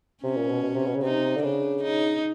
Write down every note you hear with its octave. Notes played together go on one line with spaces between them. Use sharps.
C3 C#4
A#2
B2
B2
C3
B2
C#3
C3 D#4
D3
C#3 D4
D#4